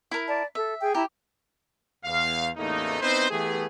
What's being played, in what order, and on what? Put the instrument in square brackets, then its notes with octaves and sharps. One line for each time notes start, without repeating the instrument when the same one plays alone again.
[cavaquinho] E4 A#4
[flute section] D5 A5
[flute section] A4 [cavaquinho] E5
[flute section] G#4 G5
[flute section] E4 A#5 [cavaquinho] G4
[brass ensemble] E2 F5
A1 E2 A3 A#3 D#4
B3 C4 D#4 E4 B4 C5
E3 A3 B3 G4 G#4